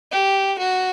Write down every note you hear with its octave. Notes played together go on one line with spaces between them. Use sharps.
G4
F#4